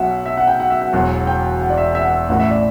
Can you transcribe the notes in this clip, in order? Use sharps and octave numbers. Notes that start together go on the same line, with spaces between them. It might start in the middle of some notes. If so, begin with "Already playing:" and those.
Already playing: B1 B2 F#3 E5 F#5
E5
F#5
G5
F#5
E5
F#5
E1 E2 B2 F#3 F#5
G5
F#5
D5
E5
E5
F#5
E5
A1 A2 E3 F#5
E5
D5